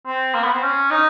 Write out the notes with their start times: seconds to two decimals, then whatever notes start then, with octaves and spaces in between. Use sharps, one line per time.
0.07 C4
0.34 A#3
0.44 B3
0.53 C4
0.63 C#4
0.90 D#4